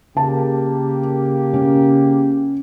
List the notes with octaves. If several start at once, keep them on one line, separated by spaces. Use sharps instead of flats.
C#3 A#3 G4 A5
C#4